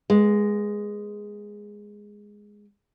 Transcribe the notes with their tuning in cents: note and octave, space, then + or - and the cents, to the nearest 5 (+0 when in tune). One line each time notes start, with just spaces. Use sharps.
G#3 -5 B3 -25